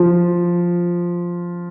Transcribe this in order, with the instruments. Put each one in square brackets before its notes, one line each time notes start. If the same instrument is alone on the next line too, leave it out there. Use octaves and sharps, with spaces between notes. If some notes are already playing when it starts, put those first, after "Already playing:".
Already playing: [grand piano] F3